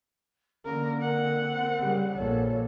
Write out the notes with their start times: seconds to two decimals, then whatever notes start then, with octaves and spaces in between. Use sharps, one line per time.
0.65 D3 A#3 C#4 A#4
1.02 C4 A#4 F#5
1.79 C#3 G3
2.15 A#1 A#2 A4 C#5